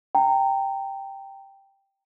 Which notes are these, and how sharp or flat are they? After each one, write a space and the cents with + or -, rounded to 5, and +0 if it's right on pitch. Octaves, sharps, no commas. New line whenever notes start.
G5 +0 A#5 -25